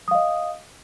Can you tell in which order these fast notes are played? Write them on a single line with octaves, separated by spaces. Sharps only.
D#6 F5 D#5